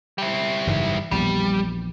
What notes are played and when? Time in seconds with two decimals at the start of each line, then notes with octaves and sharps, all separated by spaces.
0.18 G3 E4
0.67 F#1 G#2 E3
1.11 A#1 E2 B2 G3